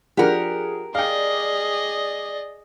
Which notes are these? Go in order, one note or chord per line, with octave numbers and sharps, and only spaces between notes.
F3 D4 G4 G#4 A#4 F#5
G#4 D5 D#5 F5 G5